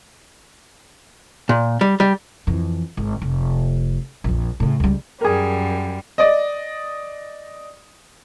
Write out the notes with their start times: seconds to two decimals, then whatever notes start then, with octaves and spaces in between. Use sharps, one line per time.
1.49 A#2
1.81 G3
2.00 G3
2.47 F2 E3
2.97 G#1
3.22 F1
4.24 A#1 F2
4.60 A2 C#3
4.80 C#2 G3
5.21 F#2 G3 G#4 A#4
6.18 D5 D#5